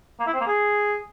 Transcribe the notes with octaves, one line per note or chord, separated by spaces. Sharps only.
A#3
E4
C4
A#3
G#4